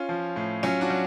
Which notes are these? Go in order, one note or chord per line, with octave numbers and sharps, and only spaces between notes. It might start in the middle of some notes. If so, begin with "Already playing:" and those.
Already playing: C#4 F4
F3
A2
F#3 C#4 F4
D4 F#4
F#3